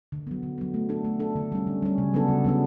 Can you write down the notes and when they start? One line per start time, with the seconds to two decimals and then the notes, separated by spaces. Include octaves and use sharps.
0.12 D3
0.27 F#3 B3
0.43 D3
0.58 F#3 B3
0.74 A3
0.89 D4 A4
1.05 A3
1.20 D4 A4
1.36 D3
1.52 G3 C#4
1.67 D3
1.82 G3 C#4
1.98 C#3
2.13 F#3 B3 D4 A4
2.28 C#3
2.44 F#3 B3 D4 A4